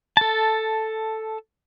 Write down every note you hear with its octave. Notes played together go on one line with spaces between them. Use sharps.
A4 A5